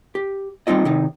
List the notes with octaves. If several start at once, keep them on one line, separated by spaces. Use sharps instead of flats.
G4
G3 C4 D#4 F4 D#5
C3 D#3 D#4